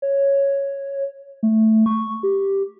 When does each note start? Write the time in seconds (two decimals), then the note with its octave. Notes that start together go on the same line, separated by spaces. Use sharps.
0.02 C#5
1.43 A3
1.86 C#6
2.23 G4